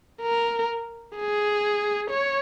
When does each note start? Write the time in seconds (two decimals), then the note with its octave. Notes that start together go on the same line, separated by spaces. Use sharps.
0.21 A#4
1.15 G#4
2.10 C#5